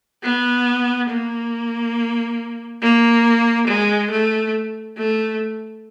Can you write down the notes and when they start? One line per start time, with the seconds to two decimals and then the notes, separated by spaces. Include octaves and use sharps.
0.23 B3
1.10 A#3
2.82 A#3
3.68 G#3
4.11 A3
4.97 A3